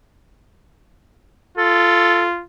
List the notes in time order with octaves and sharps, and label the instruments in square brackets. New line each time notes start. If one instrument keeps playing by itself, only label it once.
[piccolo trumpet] F4 [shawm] A4